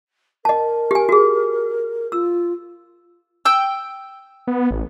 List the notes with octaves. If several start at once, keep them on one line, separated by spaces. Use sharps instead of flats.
A#4 D#5 A5
G4 G#5
F#4 G#4
F4 E6
G5 E6
B3
A1